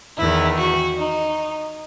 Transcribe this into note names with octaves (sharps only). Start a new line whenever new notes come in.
E2 D#3 E4
F#4
D#4